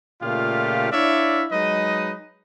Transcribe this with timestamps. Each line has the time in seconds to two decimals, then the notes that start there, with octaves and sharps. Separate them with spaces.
0.22 A#2 C#3 A3 F4 G4 F5
0.91 D4 E4 C#5 D5 E5 F5
1.51 F#3 G#3 D#4 B4 D#5